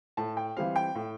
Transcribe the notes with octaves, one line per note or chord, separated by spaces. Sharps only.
A2 A5
G5
E3 G3 C4 F5
G5
A2